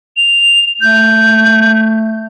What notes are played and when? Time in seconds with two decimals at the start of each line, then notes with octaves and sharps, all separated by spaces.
0.17 F7
0.81 A3 G6